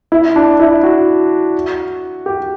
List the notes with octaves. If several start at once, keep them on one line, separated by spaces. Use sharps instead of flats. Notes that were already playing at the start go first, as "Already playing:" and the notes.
E4
D4
E4
F#4
G4